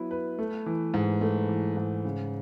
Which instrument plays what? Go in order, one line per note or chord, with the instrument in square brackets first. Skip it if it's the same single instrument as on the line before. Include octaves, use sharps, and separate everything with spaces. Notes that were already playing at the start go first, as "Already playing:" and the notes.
Already playing: [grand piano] F#3 B3 E4 B4
B4
A3
E3
G#2
A3
E3
G#2
C#3